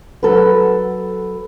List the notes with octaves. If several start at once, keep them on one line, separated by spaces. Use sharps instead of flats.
F#3 A4 B4